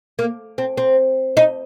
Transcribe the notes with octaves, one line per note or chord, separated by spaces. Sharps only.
A#3
C4
C4
D#4